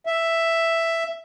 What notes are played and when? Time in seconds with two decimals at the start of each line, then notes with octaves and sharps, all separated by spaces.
0.06 E5